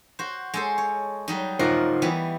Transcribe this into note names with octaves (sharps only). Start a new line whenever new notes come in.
F#4 C5
G#3 A4 C5
C#5
F#3 G3 D#4
D#4 F4 F#4 A#4 C5 F#5
E3 G3 B3